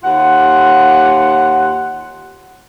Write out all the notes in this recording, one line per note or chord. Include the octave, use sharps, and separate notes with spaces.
D#2 F4 F#5